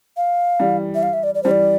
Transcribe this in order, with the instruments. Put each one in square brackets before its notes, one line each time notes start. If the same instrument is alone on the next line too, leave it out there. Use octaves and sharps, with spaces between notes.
[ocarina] F5
[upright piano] E3 G3
[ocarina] E5
F5
E5
D5
D5
[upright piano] E3 G3 [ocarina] C5
[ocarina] D5